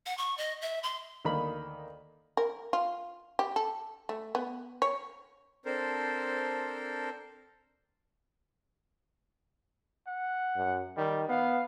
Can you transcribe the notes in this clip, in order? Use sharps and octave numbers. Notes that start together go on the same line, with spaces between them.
F#5
C#6
D#5
E5
C6
D2 D#3 A#3 B5
A#4
F4
G4
A4
A3
B3
C#5
C4 D4 A4 A#4 C5
F#5
F#2
D#3 G3
B3 F5